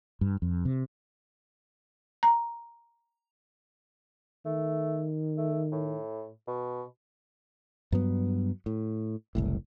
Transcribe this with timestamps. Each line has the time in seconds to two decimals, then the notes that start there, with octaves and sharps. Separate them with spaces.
0.21 G2
0.42 F2
0.65 C3
2.23 A#5
4.45 D#3 A3
5.37 A3
5.72 A2
6.48 B2
7.92 G2 F#3 B3
8.66 A2
9.35 F#1 C2 A2